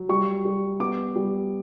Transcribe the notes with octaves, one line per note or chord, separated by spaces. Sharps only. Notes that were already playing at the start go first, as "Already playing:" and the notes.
Already playing: F#3
G3 C#6
G3
B3 D6
G3